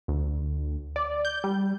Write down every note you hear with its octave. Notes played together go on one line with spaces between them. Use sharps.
D2
D5
G6
G3